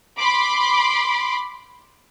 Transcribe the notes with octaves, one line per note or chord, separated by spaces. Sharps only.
B5 C6 D6